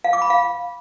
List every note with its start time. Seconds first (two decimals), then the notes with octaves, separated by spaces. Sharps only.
0.04 F5
0.13 D6
0.22 B5
0.30 F5